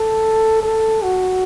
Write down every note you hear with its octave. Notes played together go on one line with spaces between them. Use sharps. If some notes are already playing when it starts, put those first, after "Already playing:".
Already playing: A4
A4
F#4